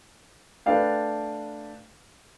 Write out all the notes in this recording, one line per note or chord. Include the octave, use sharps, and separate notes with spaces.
A3 D4 B4 D5 F5 G5